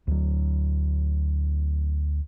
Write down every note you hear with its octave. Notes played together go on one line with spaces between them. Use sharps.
D2 F#3